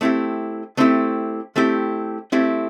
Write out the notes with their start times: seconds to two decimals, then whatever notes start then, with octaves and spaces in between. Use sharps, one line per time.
0.01 A3 C4 E4 G4
0.77 A3 C4 E4 G4
1.56 A3 C4 E4 G4
2.32 A3 C4 E4 G4